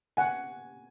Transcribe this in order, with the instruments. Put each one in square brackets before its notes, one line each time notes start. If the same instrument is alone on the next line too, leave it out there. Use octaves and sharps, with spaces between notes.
[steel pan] F#5 [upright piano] G#5